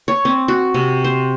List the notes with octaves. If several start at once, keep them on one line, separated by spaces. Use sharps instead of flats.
C#5
C4
F#4
C3
C5